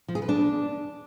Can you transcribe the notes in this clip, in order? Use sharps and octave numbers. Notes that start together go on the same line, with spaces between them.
F3
G#4
B4
D4